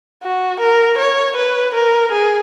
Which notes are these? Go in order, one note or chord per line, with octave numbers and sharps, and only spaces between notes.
F#4
A#4
C#5
B4
A#4
G#4